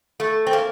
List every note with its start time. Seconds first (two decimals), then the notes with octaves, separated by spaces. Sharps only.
0.20 A3
0.47 C4
0.53 A#3